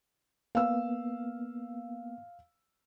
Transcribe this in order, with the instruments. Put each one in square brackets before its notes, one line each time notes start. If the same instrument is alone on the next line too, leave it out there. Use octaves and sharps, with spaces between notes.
[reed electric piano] A#3 B3 [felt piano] F5 E6